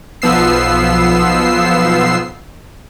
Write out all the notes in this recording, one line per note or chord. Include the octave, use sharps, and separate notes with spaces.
B1 F3 B3 E6 C7